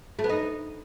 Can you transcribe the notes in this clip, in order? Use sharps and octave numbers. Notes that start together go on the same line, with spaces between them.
A3
B3
D#4